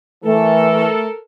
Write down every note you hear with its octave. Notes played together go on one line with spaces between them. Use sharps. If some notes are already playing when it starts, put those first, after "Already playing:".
E3 A3 A4 A#4